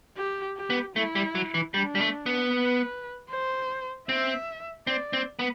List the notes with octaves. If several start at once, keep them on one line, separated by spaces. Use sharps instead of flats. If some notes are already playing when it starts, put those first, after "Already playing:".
G4
G4
B3
A3 E4
G3
F#3
E3
G3 D4
G3
A3
B3
B4
C5
C4 E5
C4 D5
C4
B3